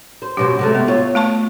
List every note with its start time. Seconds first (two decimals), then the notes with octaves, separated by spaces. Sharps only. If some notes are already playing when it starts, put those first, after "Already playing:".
0.22 C5
0.37 F#2 B2 G4 C5
0.59 C3 G#3 A3
0.75 B3
0.88 F4 C#5
1.15 A3 A5 C#6